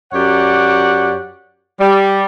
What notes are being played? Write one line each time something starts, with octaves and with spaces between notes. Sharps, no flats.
F#2 G4 C#5 D5 F#5
G3